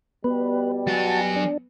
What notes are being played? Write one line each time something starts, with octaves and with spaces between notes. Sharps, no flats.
B2 G3 B3 B4
F#3 F#4 G#5 A5
D4